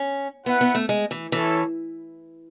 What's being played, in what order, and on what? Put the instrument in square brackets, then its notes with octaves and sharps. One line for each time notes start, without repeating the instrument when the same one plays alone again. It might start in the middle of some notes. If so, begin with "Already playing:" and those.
Already playing: [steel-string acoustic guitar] C#4
[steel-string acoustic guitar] B3 [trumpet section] E4 B4 F#5
[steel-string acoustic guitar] B3
A3
G#3
E3
[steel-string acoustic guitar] E3 [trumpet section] C#4 E4 A4 C#5